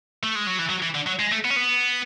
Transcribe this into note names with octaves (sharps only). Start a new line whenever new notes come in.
A3
G#3
F#3
E3
F#3
E3
D3
F#3
G#3
A3
B3
C#4
B3